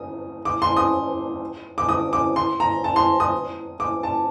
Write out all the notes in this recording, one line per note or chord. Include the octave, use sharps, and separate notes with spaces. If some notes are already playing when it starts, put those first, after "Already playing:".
Already playing: D#6
D6
C6
D#6
D6
D#6
D6
C6
A#5
A5
C6
D#6
D6
A5